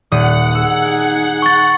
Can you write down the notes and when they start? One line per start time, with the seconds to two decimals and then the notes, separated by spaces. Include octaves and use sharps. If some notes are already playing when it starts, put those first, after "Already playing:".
0.12 D#1 F#5 D#6
0.55 D#4 G#4 E6
1.42 C#6 A6